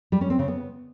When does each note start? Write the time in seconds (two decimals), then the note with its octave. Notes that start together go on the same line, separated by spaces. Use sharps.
0.12 G3
0.21 C#4
0.30 C4
0.39 C#3
0.48 B3